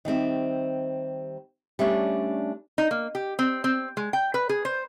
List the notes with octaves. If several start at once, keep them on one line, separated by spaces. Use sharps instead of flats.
D#3 G3 C4 E5
G3 A3 C#4 D4
D#4
A#3
G4
C4
C4
G#3
G5
B4
G#4
C5